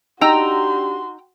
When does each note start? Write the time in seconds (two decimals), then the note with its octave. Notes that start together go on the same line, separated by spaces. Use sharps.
0.21 D4 D#4 F#4 G4 G5 A#5 C6 E6